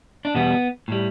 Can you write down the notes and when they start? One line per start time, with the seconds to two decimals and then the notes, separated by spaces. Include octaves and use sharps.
0.25 D4
0.35 E2 B2 G3 B3
0.88 A2 G3